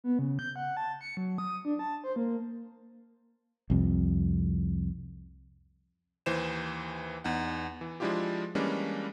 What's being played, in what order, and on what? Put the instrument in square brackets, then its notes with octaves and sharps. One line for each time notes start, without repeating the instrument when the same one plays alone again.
[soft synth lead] B3
C#3
G6
F#5
A5
C#7
F#3
D#6
D4
A5
C5
A#3
[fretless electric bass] C2 F2
[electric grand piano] D#2 E3 C5 E7
E2 D#4 F#5
E3
F3 G#3 D4 E4 F4 G4
E3 G3 G#3 A#3 C#4 D4